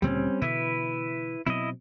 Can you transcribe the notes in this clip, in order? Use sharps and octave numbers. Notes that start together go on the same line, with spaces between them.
D2 A#2 C#3 G3 C4 C#4
B2 D3 E3 E4 B4 E5
B2 F#3 C4 E4 D#5